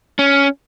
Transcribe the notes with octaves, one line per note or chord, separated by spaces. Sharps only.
C#4